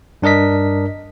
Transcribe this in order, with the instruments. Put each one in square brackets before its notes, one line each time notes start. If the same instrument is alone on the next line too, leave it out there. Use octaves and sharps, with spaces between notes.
[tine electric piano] G2 D4 A#4 D#5 B6